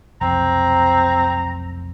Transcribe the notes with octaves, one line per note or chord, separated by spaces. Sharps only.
F1 B1 F2 C4 A#5